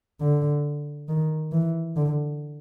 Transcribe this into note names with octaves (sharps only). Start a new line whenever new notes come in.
D3
D#3
E3
D3